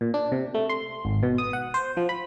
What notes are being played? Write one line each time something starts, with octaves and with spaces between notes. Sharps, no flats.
A#2
D4
C3
A3
C6
G#1
B2
D#6
F#5
C5
F3
B5